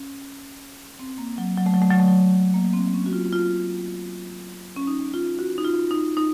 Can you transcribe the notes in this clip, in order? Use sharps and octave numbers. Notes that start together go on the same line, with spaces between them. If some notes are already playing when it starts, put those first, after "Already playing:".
Already playing: C#4
C4
A#3
F#3
F#3
A3
F#3
A3
F#3
A3
F#3
A#3
C4
C#4
F#4
F4
F4
C#4
D#4
F4
F#4
D#4
F4
D#4
D#4